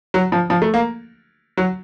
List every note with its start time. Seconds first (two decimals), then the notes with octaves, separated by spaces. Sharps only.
0.14 F#3
0.32 F3
0.50 F3
0.62 A3
0.74 A#3
1.57 F#3